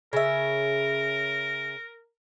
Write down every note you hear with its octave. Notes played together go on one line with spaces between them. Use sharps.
C#3 A#4 E5